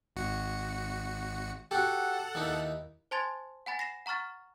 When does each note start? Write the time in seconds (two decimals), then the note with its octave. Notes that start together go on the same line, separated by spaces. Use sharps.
0.16 G#1 F#4 C#7
1.71 F#4 G4 A4 F#5
2.35 D#2 D#4 E4
3.11 C5 G#5 A5 C6 G#6 A6
3.66 F#5 G#5 B5 A6
3.79 A#6 C7 E7
4.06 F#5 A#5 C#6 F6 A6